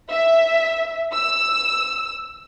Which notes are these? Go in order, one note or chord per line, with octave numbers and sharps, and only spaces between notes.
E5
E6